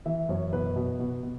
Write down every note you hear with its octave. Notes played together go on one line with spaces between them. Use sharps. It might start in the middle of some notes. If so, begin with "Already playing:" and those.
E3 E5
F#2 C#5
B2 B4
B2
B2
B2